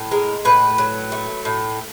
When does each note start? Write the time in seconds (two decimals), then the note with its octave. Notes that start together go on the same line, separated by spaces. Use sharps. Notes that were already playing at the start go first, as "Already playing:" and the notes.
Already playing: A2
0.11 G#3 A#4
0.45 A2 B4
0.78 F#3
1.12 A3
1.45 A2